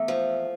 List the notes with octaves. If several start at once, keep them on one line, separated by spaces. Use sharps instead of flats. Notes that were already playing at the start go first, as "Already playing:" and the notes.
Already playing: E2 A3
F3